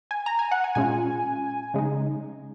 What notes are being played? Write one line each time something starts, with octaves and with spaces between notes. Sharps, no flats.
G#5
A#5
G#5
F#5
G#5
A#2 G#3 C#4 F4 G#5
C#3 G#3 D#4